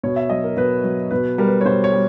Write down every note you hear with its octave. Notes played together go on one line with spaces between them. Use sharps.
B2 C#5
E5
F#3 D#5
A#4
B2 B4
F#3
B2 B4
G3 A#4
B4
C#5
B2 C5
C#5
G3